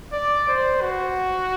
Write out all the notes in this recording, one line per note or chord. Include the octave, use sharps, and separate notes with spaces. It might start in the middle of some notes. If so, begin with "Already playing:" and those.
D5
C5
F#4